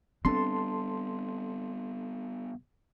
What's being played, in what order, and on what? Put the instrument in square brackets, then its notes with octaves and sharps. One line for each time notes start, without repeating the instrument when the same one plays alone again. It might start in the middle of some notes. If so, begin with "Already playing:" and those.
[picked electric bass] G3 B3 [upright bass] C4 D4 [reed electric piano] A4 A5 C6